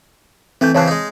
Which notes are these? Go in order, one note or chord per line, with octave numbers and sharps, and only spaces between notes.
E3 A3 C4 G6
C#3 E3 C4 C#5 A5 F#6
G#3 D#4